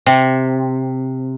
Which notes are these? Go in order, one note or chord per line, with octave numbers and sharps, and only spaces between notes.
C3